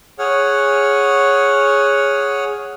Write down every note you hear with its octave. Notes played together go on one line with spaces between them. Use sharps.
G#4 C#5 F#5 F6